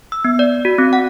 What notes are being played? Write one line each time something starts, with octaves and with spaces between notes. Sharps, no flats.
E6
B3
D5
F#4
C4
F#5